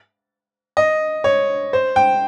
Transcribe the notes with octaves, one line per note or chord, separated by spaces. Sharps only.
D#5
C#5
C5
G5